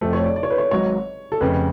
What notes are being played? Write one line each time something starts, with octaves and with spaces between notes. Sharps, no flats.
F1 F2 F3 A3 A4
C#5
D5
D5
C#5
B4
C#5
G#1 G#2 F#3 C#5
A4
F1 F2 C#3 B4